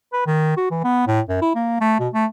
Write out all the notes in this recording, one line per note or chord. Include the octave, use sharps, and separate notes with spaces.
B4
D#3
F#4
E3
B3
A2
F#2
E4
A#3
A3
B2
A3